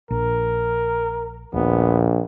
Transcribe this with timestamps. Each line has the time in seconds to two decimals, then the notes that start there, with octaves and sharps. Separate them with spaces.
0.11 A#1 A#4
1.54 D#1 A#1 B3